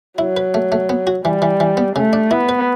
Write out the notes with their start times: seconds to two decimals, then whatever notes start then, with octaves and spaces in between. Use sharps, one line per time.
0.18 F#3 E4
0.37 B4
0.54 A3
0.72 A3
0.89 B3
1.07 F#4
1.25 E3 G3
1.42 E3
1.60 E3
1.77 B3
1.96 C#3 A3
2.13 D4
2.31 B3 E4
2.49 B4